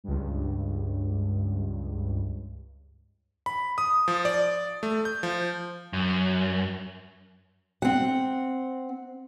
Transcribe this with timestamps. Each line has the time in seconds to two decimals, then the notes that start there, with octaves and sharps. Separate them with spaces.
0.04 C#2 G2
3.46 B5
3.78 D#6
4.08 F3
4.25 D5
4.83 A3
5.05 G6
5.23 F3
5.93 F#2
7.82 C4 F#5